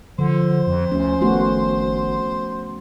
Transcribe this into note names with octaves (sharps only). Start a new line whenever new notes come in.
D3 F3 C5
F2
D2 C#4
G#1 A3 B3 F#4